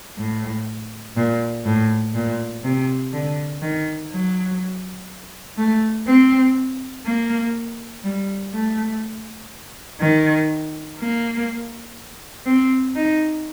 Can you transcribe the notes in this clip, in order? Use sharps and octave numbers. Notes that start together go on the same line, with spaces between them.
A2
A#2
A2
A#2
C3
D3
D#3
F#3
A3
C4
A#3
G3
A3
D#3
A#3
C4
D#4